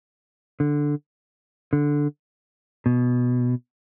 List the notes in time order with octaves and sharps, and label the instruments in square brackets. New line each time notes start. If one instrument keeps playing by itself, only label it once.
[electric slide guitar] D3
D3
B2